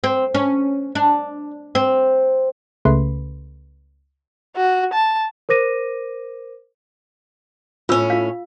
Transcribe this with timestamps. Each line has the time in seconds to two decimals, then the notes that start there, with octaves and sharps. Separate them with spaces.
0.04 C4
0.35 C#4
0.95 D4
1.75 C4
2.85 C#2 C#3 A3 B4 C6
4.56 F#4
4.93 A5
5.49 A#4 C5 D6 A#6 D#7
7.89 A2 C#4 F4 E6
8.10 F4 F5